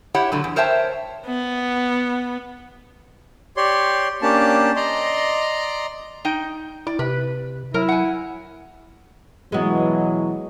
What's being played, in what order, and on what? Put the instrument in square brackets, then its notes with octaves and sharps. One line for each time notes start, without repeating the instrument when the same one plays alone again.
[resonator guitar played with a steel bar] E4 G4 C#5 F#5
A#2 D3 F#3
E2
A#4 C5 C#5 E5 G5 A5
[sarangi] B3
[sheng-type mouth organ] G4 C#5 D5 C6
A#3 C#4 D4 G4 A5
D5 D#5 A#5 C6
[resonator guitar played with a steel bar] D#4 G5
[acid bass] E4 [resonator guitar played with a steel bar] D5
[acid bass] C3 [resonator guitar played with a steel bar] B4
[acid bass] F#3 [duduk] E4 [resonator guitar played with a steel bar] A#4
[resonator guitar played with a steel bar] F#5 G#5
[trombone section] B2 E3 F#3 [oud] G#3 B3